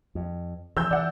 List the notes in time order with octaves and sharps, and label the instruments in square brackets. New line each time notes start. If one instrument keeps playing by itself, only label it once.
[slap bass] F2
[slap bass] E3 F3 [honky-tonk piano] E6 G6
[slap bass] E3 [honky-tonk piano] D5 F#5